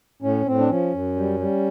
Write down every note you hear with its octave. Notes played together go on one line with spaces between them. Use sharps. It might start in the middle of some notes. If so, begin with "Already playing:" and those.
A2 C#4
A2 C4
D4
F3 C#4
F#2
G3
G3